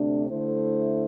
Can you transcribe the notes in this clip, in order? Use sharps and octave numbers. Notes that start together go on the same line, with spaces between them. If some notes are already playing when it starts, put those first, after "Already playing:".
Already playing: D2 C3 A3 D4
D3 A3 E4 C5